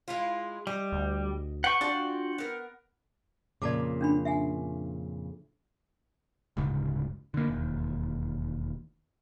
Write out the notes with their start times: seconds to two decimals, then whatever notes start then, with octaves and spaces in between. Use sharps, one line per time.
0.08 G#3 E4 F4
0.67 G3 D#5
0.92 D2
1.64 B4 F#5 G5 C#6
1.81 D4 F4 F#4 D5
2.38 B3 A#4
3.62 F2 A#2 C#3 D5 A5 D6
4.01 C#4 D4 B5
4.25 E5 F#5 G#5
6.57 D1 G1 G#2 C#3
7.34 D3 A#3
7.48 E1 D#2